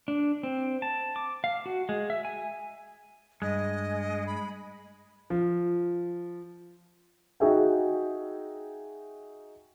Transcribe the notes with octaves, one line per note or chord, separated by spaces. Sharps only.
D4
C4
A5
D6
F5
F#4
G#3
E5
G#5
G2 G#3 D#5
B5
F3
D#4 F#4 G#4 E5 G5